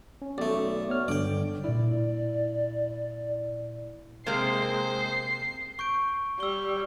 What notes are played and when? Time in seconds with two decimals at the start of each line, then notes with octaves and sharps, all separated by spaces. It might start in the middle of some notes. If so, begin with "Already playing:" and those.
0.22 C#4
0.38 B1 A3 D5
0.89 B3 C#5 F6
1.08 G2 D3 D5 G5
1.64 A#2 E4 D5
4.27 C3 G#3 A#3 C4 C5 C7
5.79 C#6 G6 D7
6.40 G3 E6 G7